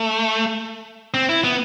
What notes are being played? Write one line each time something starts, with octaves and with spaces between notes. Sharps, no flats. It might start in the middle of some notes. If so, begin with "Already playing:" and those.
Already playing: A3
C4
E4
B3